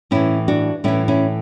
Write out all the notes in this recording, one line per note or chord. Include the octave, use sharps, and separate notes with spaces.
A2 E3 C#4 E4
D4 F#4
A2 E3 C#4 E4
C#4 E4